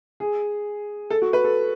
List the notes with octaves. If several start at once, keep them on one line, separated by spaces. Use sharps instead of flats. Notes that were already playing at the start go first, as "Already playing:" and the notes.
G#4
A4
F#4
B4
A4